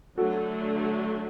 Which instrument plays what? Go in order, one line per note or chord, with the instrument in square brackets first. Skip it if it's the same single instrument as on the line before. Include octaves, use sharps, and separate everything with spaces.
[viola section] D3 F#3 A3 [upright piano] F#4 A4